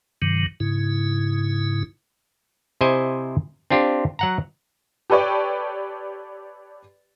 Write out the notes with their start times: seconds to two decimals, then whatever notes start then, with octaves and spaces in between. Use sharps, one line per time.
0.22 G2 C3 D#3 F#3
0.60 G#2 C#3 E4
2.81 C3 E4 C5 D#5 G#5
3.70 C4 D4 F4 G4
4.19 F#3 F#5 A#5
5.10 G4 A4 B4 C#5 D5 G5